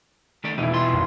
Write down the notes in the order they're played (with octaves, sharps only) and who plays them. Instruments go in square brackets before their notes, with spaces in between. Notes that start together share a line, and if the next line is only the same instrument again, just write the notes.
[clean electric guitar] D#3 A3 D5
[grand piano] E1 E4 [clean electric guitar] D#4
[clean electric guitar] C2 F4 C6
[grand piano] G#1